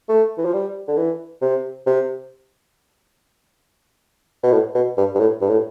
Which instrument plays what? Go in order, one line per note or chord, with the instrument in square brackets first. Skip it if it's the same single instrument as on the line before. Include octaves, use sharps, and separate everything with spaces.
[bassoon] A3
E3
F3
G3
D3
E3
C3
C3
B2
A2
B2
G2
G2
A2
G2
A2